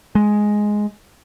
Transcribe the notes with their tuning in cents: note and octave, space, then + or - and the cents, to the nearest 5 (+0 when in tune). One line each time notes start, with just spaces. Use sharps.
G#3 +5